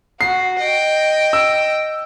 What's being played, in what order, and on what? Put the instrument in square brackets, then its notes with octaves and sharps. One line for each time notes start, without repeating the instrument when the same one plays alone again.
[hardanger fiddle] F#4 [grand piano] C7
[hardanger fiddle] D#5 G5
[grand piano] E6